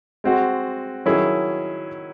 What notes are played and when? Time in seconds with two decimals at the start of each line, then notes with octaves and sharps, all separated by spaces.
0.24 G#3 C4 F#4
1.06 D#3 F#3 C#4 E4 G#4